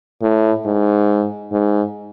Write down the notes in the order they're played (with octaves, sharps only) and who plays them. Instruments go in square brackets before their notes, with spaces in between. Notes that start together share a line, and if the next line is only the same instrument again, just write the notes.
[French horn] A2
G#2
G#2